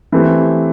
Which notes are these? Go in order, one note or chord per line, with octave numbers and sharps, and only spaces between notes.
E3 A3 C4 G4